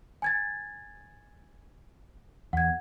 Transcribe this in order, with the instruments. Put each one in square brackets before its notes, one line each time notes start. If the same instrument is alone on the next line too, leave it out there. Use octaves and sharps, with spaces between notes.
[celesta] G#5 G#6 A6
[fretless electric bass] E2 [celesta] F#5 G#6